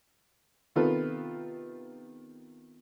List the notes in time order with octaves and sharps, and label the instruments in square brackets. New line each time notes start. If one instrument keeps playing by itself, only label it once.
[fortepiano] C3 D#3 B3 F4 A4 B4